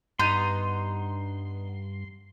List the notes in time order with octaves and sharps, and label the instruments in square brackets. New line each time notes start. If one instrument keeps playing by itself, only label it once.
[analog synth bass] G2 [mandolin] B3 D#4 G6 [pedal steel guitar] C6